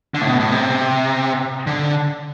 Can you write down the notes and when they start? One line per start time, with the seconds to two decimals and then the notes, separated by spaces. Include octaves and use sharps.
0.14 D3
0.21 A2
0.27 B2
0.40 A2
0.51 C3
1.67 D3